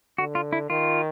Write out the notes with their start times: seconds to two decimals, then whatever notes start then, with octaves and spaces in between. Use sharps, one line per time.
0.18 D3 F#4
0.35 F4
0.53 E4
0.70 D#3 F4